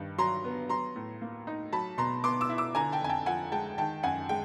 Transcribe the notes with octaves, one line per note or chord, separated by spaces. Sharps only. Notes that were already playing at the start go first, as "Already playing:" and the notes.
Already playing: G2 D#3
F#3 A#5 C6
B3
F#3 A#5 C6
A2
A#3
D#4
F#3 A5 B5
B2 A#5 C6
B3 C6 D6
D6 E6
E4
D6 E6
D3 G#5 A#5
G5 A5
F2 G#5
G5 A5
F3 F#5 G#5
G#3 G5 A5
D#3 G5 A5
F#2 F#5 G#5
G#3 G5